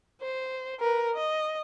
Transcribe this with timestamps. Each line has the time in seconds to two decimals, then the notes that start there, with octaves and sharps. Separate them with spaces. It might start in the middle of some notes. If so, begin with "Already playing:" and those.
0.22 C5
0.80 A#4 B4
1.14 D#5